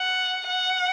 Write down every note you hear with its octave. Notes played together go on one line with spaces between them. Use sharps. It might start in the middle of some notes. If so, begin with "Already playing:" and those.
Already playing: F#5
F#5